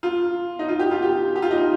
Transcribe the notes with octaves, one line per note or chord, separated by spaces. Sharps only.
F4
D#4
F4
G4
F4
G4
G4
F4
D#4
F4